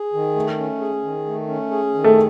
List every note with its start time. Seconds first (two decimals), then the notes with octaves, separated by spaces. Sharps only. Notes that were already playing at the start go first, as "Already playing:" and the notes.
Already playing: G#4
0.13 D#3
0.36 A3
0.58 C#4
0.81 G#4
1.03 D#3
1.26 A3
1.48 C#4
1.71 G#4
1.94 D#3
2.04 A3